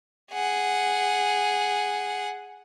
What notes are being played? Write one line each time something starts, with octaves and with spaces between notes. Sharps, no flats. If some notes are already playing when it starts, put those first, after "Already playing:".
G#4 F#5